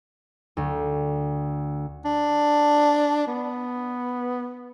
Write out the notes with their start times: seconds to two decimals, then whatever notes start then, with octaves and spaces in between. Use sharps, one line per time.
0.57 D2
2.05 D4
3.27 B3